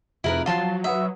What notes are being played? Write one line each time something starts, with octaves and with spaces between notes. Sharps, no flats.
F1 F2 E4 F4 G#4 A#4 B4
F3 F#3 F4 F#4 F5 A5 C6
B4 E5 F#5 D#6